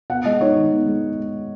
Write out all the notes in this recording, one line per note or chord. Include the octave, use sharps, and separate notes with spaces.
B3 F#5
G#3 D#5
D#4 C#5
D#3
B3
G#3